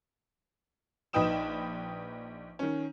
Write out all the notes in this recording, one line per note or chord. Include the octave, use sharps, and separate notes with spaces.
A#1 D#4 B4 G5 D#6 E7
D#3 C#4